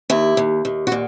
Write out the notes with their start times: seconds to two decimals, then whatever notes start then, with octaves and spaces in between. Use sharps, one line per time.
0.10 D#2 E4
0.37 D#2
0.65 D#2
0.87 F#4
0.92 A#2